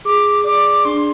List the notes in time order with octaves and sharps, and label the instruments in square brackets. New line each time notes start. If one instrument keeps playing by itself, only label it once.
[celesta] G#4 [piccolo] D6
[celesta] D5 [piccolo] D6
[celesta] D4 [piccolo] C6